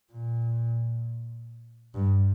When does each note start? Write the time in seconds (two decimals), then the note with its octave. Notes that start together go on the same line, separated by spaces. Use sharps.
0.13 A#2
1.94 G2